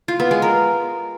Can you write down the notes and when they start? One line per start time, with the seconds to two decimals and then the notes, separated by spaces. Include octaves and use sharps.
0.08 F4
0.20 B3
0.31 G#3
0.42 A#4